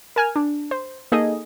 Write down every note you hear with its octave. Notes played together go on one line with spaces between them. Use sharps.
A#4 G#5 F6
D4
C5
A#3 D#4 G#4 A4 D#5